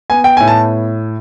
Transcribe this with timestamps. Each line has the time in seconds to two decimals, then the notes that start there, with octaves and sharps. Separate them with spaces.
0.10 B3 G#5
0.24 G5
0.37 A2 G#5
0.48 A5